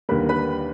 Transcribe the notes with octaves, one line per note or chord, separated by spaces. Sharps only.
D#2 D3 G3 A#3 B4 B5
B4 B5